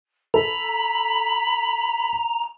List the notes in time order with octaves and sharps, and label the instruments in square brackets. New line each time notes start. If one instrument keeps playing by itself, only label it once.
[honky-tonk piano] A4 [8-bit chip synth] A#5 [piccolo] B5